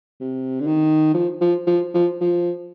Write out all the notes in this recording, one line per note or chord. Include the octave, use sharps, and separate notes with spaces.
C3
D3
D#3
F3
F3
F3
F3
F3